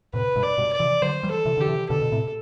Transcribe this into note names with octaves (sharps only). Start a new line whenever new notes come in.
A2 C3 B4
G2 B2
D5
G2 B2
D5
C3 E3
D3 F#3 C5
E3 G3
A4
C3 E3
D3 G4
C3 E3
B2 D3 A4
B2
A2 C3